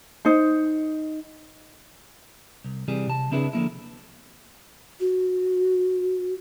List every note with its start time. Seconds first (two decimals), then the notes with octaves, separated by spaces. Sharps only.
0.25 D#4 C5
2.65 C2
2.88 C3 E3 G3 G#4
3.07 C3 A5
3.31 C#3 C4 D4 E4 G#4 B4
3.53 D3 F3 A#3 E4
5.00 F#4